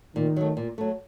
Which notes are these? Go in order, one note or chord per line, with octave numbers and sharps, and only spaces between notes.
A#2 D#3
F#3 A3
A#2
F#3 A3